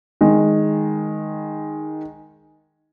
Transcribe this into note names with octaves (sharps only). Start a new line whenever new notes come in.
D#3 G#3